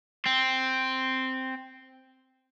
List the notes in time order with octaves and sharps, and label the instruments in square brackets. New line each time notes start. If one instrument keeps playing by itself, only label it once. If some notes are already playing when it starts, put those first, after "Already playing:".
[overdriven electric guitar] C4